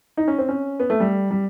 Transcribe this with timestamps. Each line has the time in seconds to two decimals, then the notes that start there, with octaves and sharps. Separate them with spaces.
0.17 D#4
0.28 C#4
0.38 C4
0.49 C#4
0.80 B3
0.90 A3
1.00 G3
1.31 G3